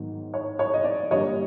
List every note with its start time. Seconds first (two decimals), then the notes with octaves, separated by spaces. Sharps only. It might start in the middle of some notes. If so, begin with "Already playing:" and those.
Already playing: G#2 D#3 F#3 B3
0.34 C#5
0.59 C#5
0.74 D#5
0.84 D5
1.10 G2 D3 G3 A#3 D4 C#5 D#5